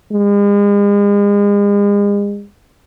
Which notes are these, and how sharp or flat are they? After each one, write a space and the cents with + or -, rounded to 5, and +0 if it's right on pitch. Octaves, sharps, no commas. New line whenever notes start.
G#3 -40